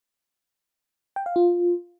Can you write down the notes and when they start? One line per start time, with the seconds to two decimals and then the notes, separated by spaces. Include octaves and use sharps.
1.16 G5
1.26 F5
1.36 F4